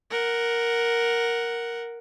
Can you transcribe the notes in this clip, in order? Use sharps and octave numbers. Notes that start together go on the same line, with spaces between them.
A#4 F#5